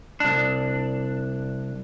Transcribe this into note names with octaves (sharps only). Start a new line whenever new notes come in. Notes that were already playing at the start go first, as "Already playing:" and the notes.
C2 D4